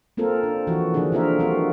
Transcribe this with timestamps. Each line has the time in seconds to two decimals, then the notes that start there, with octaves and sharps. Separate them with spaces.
0.17 A#3 C4 F4 A4 A#4
0.43 D4
0.67 E3 F3 E4 F#4
0.94 D3 D#3 F3 A#3 D4 G#4
1.12 D3 A#3 C4 F4 A#4 E5
1.39 F3 G3 C4 F4 F#4